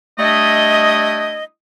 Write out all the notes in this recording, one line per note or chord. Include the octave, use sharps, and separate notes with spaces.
G3 A3 D4 E4 D#5